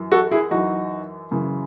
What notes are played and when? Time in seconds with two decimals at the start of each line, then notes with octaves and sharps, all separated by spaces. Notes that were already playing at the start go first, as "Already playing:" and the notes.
Already playing: F#2 E3
0.11 F#4 A4
0.31 E4 G#4
0.51 F#2 E3 D#4 F#4
1.31 F#2 C#3 E3